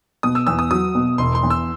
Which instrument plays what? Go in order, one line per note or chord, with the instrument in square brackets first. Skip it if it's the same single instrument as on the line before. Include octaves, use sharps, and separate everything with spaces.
[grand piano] B2 [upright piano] D#6
[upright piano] E6
[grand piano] E2 [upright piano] E6
[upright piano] D#6
[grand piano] F#3 [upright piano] D#6
[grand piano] B2
[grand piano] E1 [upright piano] C6
[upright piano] C6
[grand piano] E2
[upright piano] E6